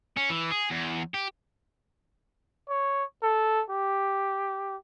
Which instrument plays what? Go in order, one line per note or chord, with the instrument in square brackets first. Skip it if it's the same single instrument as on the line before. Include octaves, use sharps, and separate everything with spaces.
[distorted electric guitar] C#4
E3
G#4
E2
G4
[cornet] C#5
A4
G4